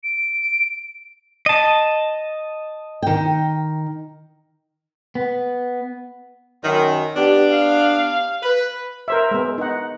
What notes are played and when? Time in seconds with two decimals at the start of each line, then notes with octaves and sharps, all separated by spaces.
0.04 D7
1.46 D#5 A5
3.03 D#3 G5
5.15 B3
6.64 F#2 D#3
7.16 B3 D4 G4
7.51 F5
8.43 B4
9.08 A#4 C5 E5
9.31 G#3 B3
9.58 D#4 F#5